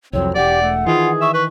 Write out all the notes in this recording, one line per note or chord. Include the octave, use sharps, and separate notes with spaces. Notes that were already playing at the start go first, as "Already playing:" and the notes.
C2 F2 F#3 C4 C#5
E1 G4 D5 F#5
A3
D#3 E3 F4 G#4
E5 C#6
B4 C#6